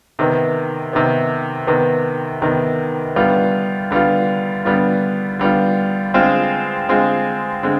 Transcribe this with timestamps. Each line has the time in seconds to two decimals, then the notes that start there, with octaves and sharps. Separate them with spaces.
0.19 C3 D#3 B3
0.93 C3 D#3 B3
1.67 C3 D#3 B3
2.42 C3 D#3 B3
3.16 D3 G3 B3 F4
3.91 D3 G3 B3 F4
4.65 D3 G3 B3 F4
5.39 D3 G3 B3 F4
6.14 D3 G#3 C4 F4 G#4
6.88 D3 G#3 C4 F4 G#4
7.63 D3 G#3 C4